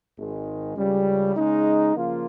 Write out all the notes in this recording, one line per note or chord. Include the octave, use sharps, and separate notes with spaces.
G#1 G#2 D#3 G#3
C#2 C#3 G3
C#3 G#3 D#4
C#3 F3 A#3 F4